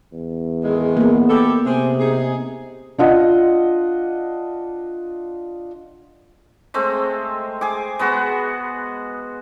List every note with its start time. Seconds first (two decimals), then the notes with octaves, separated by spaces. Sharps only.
0.12 E2
0.64 A2 D#3 G#3
0.97 A#3 B3
1.29 E4 G4 A4
1.65 C3 G#3 C4 G#4
1.99 D#4 G#4
2.98 D4 F4 D#5 F#5
6.74 G#3 A3 C4
7.61 G#4 G#5 D6
7.99 G#3 B3 F#4